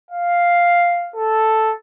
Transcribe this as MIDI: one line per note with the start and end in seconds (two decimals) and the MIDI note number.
0.11 1.10 77
1.16 1.73 69